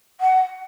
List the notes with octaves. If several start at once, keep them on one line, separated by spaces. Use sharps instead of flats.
F#5